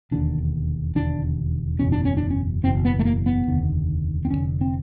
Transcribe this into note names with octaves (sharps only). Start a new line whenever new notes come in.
E1 D#2 D3 D4
E1 D#2 D3 D4
F#1 E2 B2 C#4
D4
C#4
D4
C#4
F#1 E2 B2 C4
B3
A3
A#3
B3
F1 D#2 D3
C4
D#2 D3 C#4
F1
C4